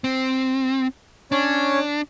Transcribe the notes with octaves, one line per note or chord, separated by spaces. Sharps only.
C4
C#4 D4 C#5